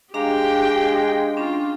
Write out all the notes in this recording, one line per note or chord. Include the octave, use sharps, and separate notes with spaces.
G#3 D4 G4 F5 G5 A#5
C#4 D4 F4